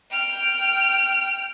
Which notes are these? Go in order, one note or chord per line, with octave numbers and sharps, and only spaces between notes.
G5 F6